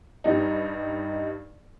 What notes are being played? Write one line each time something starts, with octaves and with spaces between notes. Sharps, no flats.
G2 G3 D#4